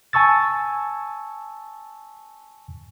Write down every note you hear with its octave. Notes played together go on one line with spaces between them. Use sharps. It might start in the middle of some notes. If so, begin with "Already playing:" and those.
G#5 A5 C#6 E6 A6